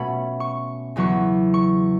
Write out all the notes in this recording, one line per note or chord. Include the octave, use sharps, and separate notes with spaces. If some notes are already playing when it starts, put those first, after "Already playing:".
Already playing: B2 A3 C#4 B5
C#6
E2 C#3 F#3 B3 C#6
C#6